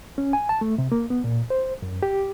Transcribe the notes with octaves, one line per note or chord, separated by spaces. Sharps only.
C#4
G#5
A5
A3
C3
A#3
B3
A#2
C5
F#2
G4